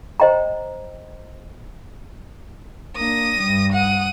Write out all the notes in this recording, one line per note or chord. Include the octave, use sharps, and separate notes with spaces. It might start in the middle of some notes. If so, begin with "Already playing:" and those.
C5 D#5 G5 A#5
A#3 D4 D#6 A#6
G2 G3
F#5 D#6